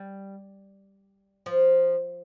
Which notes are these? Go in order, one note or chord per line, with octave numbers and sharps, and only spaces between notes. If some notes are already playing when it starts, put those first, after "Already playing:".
Already playing: G3
F3